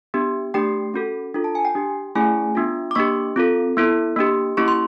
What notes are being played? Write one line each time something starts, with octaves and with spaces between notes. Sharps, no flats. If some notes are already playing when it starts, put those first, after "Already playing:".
B3 D4 G4
A3 D4 G4 G5
C#4 F#4 A4
D4 F4 A4
A5
G#5
G5
D4 G4
A3 C#4 E4 G#4 G#5
B3 D4 F4
D6
A#3 D4 G4 C#6
C4 F4 A4
B3 E4 A4
A#3 D4 G4
A#3 C#4 E4 G4 C#6
C6